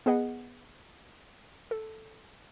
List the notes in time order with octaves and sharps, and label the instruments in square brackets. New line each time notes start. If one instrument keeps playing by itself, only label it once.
[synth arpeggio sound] B3 G#4 B4 D#5 F#5
A4